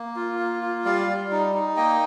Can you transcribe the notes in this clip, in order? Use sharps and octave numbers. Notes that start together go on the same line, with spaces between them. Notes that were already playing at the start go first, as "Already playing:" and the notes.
Already playing: A#3
F4
A#3
F4
G3 D5 F5
G3
D#4
D#4
A#3 D#5 G5